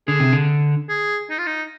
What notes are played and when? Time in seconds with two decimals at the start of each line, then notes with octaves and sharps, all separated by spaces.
0.08 D3 G#4
0.20 C3
0.33 D3
0.89 G#4
1.30 D#4
1.39 F4
1.47 D#4